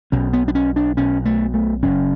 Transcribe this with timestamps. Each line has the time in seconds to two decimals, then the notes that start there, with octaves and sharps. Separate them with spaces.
0.12 B1 B2 C#4
0.33 B3
0.48 D4
0.55 C#4
0.76 D4
0.97 B1 B2 C#4
1.25 A3
1.54 A3
1.83 F#1 F#2 C#3 C#4